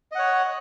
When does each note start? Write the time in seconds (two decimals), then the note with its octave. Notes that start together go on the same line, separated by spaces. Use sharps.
0.12 D#5
0.15 F#5
0.18 C#5